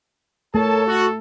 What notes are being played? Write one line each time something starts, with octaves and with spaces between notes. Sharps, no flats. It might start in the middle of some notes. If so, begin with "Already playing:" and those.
A3 A4 A#4 C#5 A5
F#4